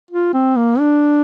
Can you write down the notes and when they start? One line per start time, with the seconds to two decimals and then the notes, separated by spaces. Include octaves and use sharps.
0.11 F4
0.33 C4
0.56 A#3
0.79 D4